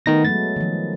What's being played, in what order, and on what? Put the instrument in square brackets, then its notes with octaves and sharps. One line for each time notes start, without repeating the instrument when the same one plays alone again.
[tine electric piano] D#3 D#4 A#6 [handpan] A3 B3
[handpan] F#3 G#3 A3 [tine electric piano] A6
[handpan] D#3 F3